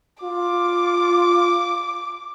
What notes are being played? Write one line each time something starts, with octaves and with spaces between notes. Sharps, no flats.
F4 D6